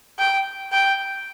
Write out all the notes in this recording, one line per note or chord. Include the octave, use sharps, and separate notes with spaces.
G5
G5